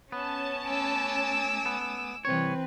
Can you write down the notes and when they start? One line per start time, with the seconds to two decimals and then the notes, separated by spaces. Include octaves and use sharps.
0.12 B3 C#4 A5
0.67 A3 G#5 D6 E6
1.66 B3
2.25 C2 E3 C4 B4 C#5